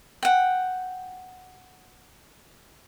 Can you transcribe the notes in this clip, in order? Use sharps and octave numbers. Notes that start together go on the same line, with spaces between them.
F#5 G5